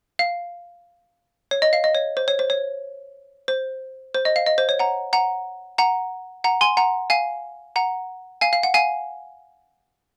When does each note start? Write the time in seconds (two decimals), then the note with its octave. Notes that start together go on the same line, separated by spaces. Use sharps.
0.19 F5
1.51 C#5
1.62 D#5
1.73 F5
1.84 D#5
1.95 C#5
2.17 C5
2.28 C#5
2.39 C5
2.50 C#5
3.48 C5
4.14 C5
4.25 D#5
4.36 F5
4.46 D#5
4.58 C5
4.69 C#5
4.79 F#5 A#5
5.13 F#5 A#5
5.78 F#5 A#5
6.44 F#5 A#5
6.61 G#5 C6
6.77 F#5 A#5
7.10 F5 G#5
7.76 F#5 A#5
8.41 F5 G#5
8.53 F5
8.63 F#5
8.74 F5 G#5